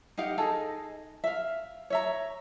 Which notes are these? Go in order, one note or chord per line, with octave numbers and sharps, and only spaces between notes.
D#4 G4 F5 F#5
D#4 G#4 A4 D#5
E5 F5
C#5 E5 A#5